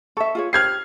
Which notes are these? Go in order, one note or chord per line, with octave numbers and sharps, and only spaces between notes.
A4 E5 C#6
F4 G#4 C#5
G4 F6 G#6 C7